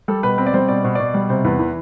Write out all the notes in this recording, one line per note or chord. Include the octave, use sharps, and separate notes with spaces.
G3 A4
B2 B4
C4 B4
D5
G3 C5
B2 D5
B2 C5
B2 D5
G3
C3 C5
E2 B4
E3 B4